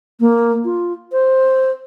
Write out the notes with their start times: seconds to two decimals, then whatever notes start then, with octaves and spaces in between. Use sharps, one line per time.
0.20 A#3
0.65 F4
1.12 C5